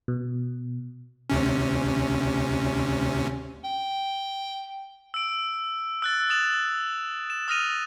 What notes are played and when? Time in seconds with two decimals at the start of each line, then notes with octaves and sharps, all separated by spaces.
0.08 B2
1.30 D2 C3 C#4
3.64 G5
5.14 E6 D7
6.02 E6 F#6 A6
6.30 D#6 A6 E7 F7
7.30 E7
7.48 D#6 F6 A6 A#6 D#7 F7